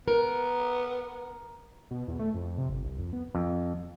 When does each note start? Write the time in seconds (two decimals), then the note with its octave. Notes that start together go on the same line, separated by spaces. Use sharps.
0.08 B3 A#4
1.91 B2
2.08 E2
2.19 A3
2.34 F2
2.58 C3
2.69 G1
2.85 C2
2.98 F2
3.13 B3
3.35 F2